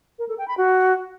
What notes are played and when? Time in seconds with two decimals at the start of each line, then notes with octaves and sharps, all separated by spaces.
0.19 A#4
0.28 A4
0.38 G5
0.48 B5
0.57 F#4